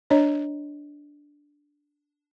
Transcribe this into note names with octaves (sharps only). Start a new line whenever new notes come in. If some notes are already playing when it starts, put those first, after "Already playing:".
D4 C#5 D#5